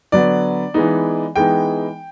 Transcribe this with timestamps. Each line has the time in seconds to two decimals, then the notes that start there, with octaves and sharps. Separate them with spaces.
0.12 D3 F#3 B3 D4 D5
0.74 E3 G#3 B3 D#4
1.36 E3 G#3 B3 D#4 G5